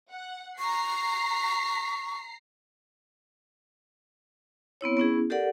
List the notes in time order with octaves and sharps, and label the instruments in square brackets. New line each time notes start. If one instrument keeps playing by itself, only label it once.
[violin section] F#5
[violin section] A#5 C7 [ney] C#6
[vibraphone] B3 C4 E4 C#5
B3 C#4 E4 G#4
G4 A4 A#4 D5 F#5